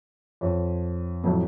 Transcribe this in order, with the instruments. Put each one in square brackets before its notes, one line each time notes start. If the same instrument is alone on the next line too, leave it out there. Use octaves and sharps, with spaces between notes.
[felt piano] F2 [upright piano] C#5
[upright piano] F2 A2 F#3